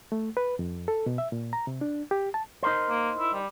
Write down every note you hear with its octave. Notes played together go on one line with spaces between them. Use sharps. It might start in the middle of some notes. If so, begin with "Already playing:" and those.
A3
B4
F2
A4
B2
E5
A#2
A#5
C3
D4
G4
A5
D#4 A#4 C5
A#3
E4
G3